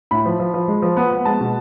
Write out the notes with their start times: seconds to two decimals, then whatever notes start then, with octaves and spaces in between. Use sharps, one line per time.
0.11 A2 B5
0.25 F3
0.40 F3
0.54 F3
0.68 G#3
0.82 F3
0.97 B3
1.11 B3
1.25 G#3 A5
1.41 B2